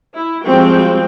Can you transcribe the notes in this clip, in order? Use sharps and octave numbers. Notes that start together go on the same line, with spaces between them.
E4
F3 G3 G#3 C4 F#4 G5